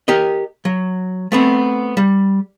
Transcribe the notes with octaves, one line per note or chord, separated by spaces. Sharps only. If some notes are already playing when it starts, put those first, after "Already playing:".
G4 A#4 D#5
F#3
A3 B3 C4
G3